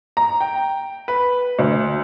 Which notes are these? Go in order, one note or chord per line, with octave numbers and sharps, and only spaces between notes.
A#5
G5
B4
D2